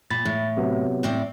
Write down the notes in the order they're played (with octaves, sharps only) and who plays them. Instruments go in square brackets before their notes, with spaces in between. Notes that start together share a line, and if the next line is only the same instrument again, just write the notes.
[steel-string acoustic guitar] A#2 [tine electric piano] B5 A6
[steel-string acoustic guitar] A2
[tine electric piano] C3 F#3 B3
[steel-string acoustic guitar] A2 C4 D5